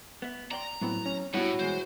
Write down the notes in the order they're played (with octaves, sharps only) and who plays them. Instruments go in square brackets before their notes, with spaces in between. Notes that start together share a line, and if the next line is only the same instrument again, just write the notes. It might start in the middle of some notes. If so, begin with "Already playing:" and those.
[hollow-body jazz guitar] B3 E5
[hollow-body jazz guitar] D5 G5 C6 [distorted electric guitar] A#5
[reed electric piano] A2 C4 [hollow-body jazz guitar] F#3 B3 E4
[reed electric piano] C#4
[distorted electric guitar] A2 [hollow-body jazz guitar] G3 B3 [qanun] E4 F#4 [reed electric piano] C#5 F#5
[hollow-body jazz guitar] B2 E3 G#3 [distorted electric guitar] C5